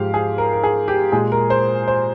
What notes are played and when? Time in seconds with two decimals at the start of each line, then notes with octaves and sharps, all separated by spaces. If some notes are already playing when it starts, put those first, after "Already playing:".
Already playing: G#2 F3 G#3 G4 F5
0.14 G#4
0.38 A#4
0.53 A#4
0.63 G#4
0.88 G4
1.12 A#2 G#3 G#4
1.32 A#4
1.50 C5
1.88 C5